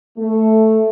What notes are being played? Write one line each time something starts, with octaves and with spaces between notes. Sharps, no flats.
A3